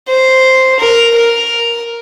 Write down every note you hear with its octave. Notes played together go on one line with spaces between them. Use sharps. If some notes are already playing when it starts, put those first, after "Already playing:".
C5
A#4
A#4